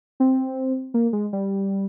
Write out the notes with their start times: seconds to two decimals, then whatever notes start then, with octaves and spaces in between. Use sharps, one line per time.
0.20 C4
0.94 A#3
1.13 G#3
1.33 G3